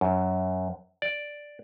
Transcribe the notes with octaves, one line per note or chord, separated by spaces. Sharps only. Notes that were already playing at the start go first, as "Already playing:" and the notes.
F#2
D5